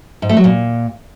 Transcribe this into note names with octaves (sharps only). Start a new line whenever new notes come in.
G#2
A3
F#3
A#2